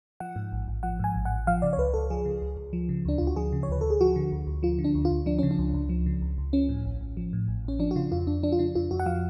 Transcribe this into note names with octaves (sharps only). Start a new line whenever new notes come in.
F3 F#5
G#2
A1
A1
F3 F#5
G#2 G#5
A1
F#5
A1
F3 F5
C#3 D5
C#5
C#2 B4
C#2 A4
F3 G#4
C#3
C#2
C#2
F3
C#3
D2 D4
D2 F4
F#4
F3 G#4
C#3
C#5
D2 B4
D2 A4
G#4
F3 F#4
D3
D2
D2
F3 F4
D3
D4
D2
F4
D2
F3 D4
C#3 C#4
D4
C#2
C#2
F3
C#3
C#2
C#2
F3 C#4
A2
A1
A1
F3
A2
A1
A1 C#4
F3 D4
F#4
C#3 F4
F2 F4
F2 D4
F3 D4
F4
C#3 D4
F2 F4
F2 F#4
F#5
F3 F5